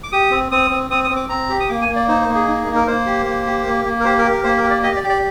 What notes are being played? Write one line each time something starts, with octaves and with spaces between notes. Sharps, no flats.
D6
G4 D#6
C4
C4 D#6
C4
C4 D#6
D#6
C4
D6
C4 A#5
G4
D#6
A#3 D6
G#5
A#3
D5
D#4 C5
C5
A#3
G#4
D#4
A#3
A#4
A#3 C5
G4
A#3
G4
A#3
A#3
A#4
G4 C5
A#4
G4
A#4
A#3 C5
A#4
G4
D5
G4 D#5
D5
G4
D5